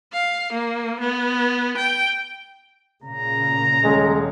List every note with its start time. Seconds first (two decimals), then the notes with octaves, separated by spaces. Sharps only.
0.13 F5
0.53 A#3
1.01 B3
1.78 G5
3.04 A#2 C#3 A#5
3.84 D#1 G#3 C#4